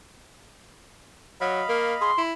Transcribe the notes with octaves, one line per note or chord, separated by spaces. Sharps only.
F#3 D#5 F5 B5
A#3
G#4 C6
E4